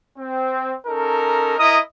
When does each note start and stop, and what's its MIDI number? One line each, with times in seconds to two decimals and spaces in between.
0.17 0.75 60
0.87 1.54 61
0.87 1.54 63
0.87 1.54 69
0.87 1.54 70
1.57 1.77 64
1.57 1.77 70
1.57 1.77 75
1.57 1.77 87